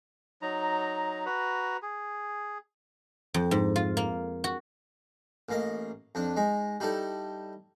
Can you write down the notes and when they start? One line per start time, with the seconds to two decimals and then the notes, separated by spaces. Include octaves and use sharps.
0.42 F#3 D#4 A#5
1.26 F#4 B4 A#5
1.82 G#4
3.34 F2
3.51 G#2
3.76 F4
3.97 A#3
4.44 F#4
5.49 A1 A#3 D#5
6.15 F2 D4
6.36 G#3 D#4
6.80 G3 D#4 E4 A4